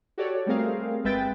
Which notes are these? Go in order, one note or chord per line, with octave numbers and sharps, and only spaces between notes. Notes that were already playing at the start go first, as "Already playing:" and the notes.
F#4 G4 A4 C#5 D5
G3 A3 C4 G#4 A#4 F5
G1 G#3 B4 E5 G5 A6